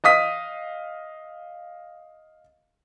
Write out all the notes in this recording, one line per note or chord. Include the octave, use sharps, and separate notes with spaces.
D#5 F5 D#6 B6